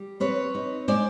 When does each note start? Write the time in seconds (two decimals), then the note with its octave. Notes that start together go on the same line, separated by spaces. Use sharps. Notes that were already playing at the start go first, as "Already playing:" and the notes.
Already playing: G3
0.20 C4 B4 C#5
0.55 D#4
0.88 G#3 C5 D5